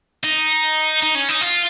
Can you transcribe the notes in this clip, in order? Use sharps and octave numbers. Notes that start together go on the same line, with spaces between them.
D#4
D#4
C#4
D#4
F4